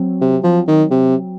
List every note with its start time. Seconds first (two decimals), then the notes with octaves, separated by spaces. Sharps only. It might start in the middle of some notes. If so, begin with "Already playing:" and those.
Already playing: F#3 C4
0.21 C3
0.44 F3
0.68 D#3
0.91 C3